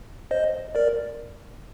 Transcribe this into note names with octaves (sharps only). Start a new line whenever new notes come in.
C5 D#5
A#4 D5